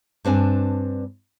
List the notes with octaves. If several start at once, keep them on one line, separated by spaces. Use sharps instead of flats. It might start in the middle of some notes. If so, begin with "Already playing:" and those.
G2 C4 D4 G#5